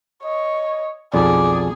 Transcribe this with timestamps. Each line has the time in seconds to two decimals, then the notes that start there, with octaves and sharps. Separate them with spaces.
0.24 C#5 D#5
1.14 B1 F2 G#4 D5